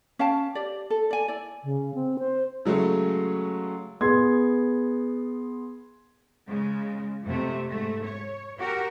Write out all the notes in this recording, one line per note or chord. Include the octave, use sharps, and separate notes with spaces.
C#4 F5 G5 A5
G4 D5
A4
D5 G#5
E4 D5
C#3
C4
C5
C#3 F#3 G#3 A3
B3 G#4 C6 G#6
C#3 G#3
F2 C3 A3
G#2 A3
C#5
F#4 G4 A#4